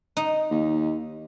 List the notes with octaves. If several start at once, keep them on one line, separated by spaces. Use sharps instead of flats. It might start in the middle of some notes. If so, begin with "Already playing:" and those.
D#4
D#2